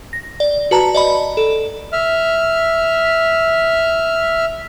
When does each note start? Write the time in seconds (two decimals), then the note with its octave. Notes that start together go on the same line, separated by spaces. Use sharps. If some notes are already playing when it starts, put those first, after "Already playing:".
0.13 A#6
0.40 D5
0.71 F#4 B4 A5 A#5
0.95 D5 D#5 B5
1.37 A4
1.93 E5 F6